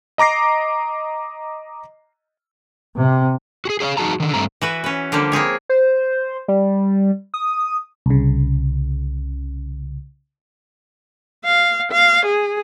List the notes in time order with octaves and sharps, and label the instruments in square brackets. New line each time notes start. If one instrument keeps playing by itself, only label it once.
[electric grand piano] D#5 A#5 D6 A#6 C7
[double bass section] C3
[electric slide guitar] F#4 G#4
G#4 C#5 D5 F5
F3 D#4 F#4 G#4 A5 A#5
D3 D#3
G2 A3 C4 A#5
[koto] E3 F#4 B4
C#4 B4
D3 F3 G3 A#3 G4
A#3 C4 G#4 C#5
[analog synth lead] C5
G3
D#6
[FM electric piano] C2 C#3
[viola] F5
F5
G#4